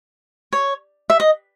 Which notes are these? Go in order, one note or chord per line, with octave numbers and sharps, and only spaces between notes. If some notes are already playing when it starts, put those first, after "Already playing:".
C#5
E5
D#5